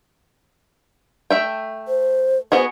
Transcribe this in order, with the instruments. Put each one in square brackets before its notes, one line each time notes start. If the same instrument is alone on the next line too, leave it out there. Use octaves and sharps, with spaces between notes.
[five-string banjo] A3 E5 G5
[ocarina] C5
[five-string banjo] B3 F#4 G#4 [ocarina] C5